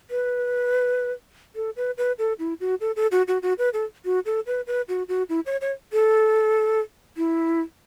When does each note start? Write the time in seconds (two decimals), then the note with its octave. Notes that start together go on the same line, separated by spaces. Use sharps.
0.10 B4
1.56 A4
1.76 B4
1.98 B4
2.19 A4
2.39 E4
2.60 F#4
2.81 A4
2.96 A4
3.12 F#4
3.28 F#4
3.42 F#4
3.58 B4
3.73 A4
4.05 F#4
4.26 A4
4.47 B4
4.67 B4
4.89 F#4
5.09 F#4
5.29 E4
5.46 C#5
5.61 C#5
5.93 A4
7.17 E4